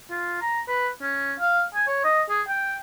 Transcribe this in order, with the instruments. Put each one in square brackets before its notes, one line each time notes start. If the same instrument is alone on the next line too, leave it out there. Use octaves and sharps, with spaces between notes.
[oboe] F4
A#5
B4
C#4
F5
G#5
C#5
D#5
G#4
G5